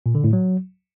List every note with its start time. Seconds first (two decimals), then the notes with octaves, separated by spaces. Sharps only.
0.06 A#2
0.15 D3
0.24 A2
0.33 F#3